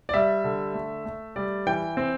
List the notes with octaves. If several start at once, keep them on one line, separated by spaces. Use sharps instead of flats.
D5
G3 E5
D3
A3
A3
G3 D5
E3 G5
C4